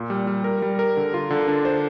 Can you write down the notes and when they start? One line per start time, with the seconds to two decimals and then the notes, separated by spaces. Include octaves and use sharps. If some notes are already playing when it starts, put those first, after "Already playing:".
Already playing: A#2
0.10 G3
0.27 G3
0.44 A#4
0.62 G3
0.79 A#4
0.97 D3
1.14 F4
1.30 D3
1.48 D4
1.65 C5